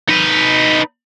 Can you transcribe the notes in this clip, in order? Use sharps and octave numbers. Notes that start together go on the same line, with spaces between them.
D#4 B4